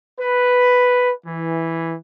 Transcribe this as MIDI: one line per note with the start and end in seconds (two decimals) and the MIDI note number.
0.19 1.12 71
1.25 1.95 52